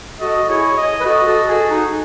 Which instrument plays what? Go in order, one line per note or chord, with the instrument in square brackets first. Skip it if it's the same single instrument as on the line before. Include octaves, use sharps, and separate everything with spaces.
[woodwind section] F#4 A4 [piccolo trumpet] D#5
[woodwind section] E4 G#4 [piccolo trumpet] C#5
[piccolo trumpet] D#5
[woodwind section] B4
[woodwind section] F#4 A4 [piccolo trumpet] D#5
[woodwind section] F#4 A4
[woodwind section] F#4 A4 [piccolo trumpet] G#4
[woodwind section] D#4 F#4